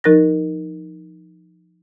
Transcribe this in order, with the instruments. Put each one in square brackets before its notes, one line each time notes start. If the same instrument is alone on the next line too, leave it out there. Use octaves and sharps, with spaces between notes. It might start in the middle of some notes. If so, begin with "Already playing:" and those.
[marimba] F3 D#4 A#4 F#6 A6 A#6